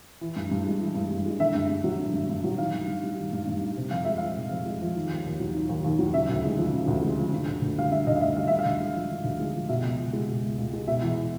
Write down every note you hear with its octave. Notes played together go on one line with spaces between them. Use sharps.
E3
G2
G2
G#3
E3
G2
G2
G#3
D3 E5
G2
G2
F#3
D3
G2
G2
F#3
D#3 F5
G2
G2
G3
D#3
G2
G2
G3
C3
F2 F5
G#3 E5
F3 F5
C3
F2
G#3
F3
D#3
D#2
D#2
F#3
D#3
D#2
D#2
F#3
C#3 E5
D2
G#3
F3
C#3
D2
G#3
F3
D3
D2
D2
G3 F5
D3 E5
D2 D#5
F5
D2 E5
G3 F5
D3 E5
F5
D2
G#3
F3
D3
D2
G#3
F3
B2 E5
C#2
C#2
G#3
B2
C#2
C#2
G#3
B2 E5
E2